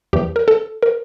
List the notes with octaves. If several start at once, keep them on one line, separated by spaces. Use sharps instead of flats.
E2 E3 G4
A#4
A4
A#4